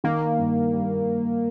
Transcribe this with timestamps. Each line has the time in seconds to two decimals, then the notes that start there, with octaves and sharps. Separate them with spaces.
0.04 D#3 A#3
0.39 G2
0.73 G3